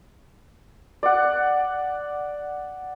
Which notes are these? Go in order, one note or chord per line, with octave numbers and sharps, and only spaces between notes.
D5 F#5